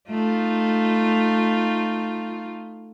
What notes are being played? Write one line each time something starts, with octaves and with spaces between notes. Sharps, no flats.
A3 D#4 F4